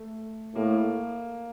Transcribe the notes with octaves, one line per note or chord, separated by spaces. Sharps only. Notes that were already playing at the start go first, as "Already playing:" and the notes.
Already playing: A3
A2 A#3